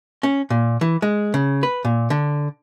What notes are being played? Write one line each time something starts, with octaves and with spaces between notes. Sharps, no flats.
C#4
A#2
E3
G#3
C#3
B4
A#2
D3